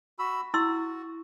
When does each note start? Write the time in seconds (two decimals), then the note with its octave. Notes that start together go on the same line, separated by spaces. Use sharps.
0.19 F#4 B5 E6
0.54 E4 F#4 C6 E6